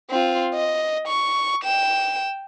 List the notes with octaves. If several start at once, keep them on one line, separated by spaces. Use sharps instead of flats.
C4 F4
D#5
C#6
G5 E7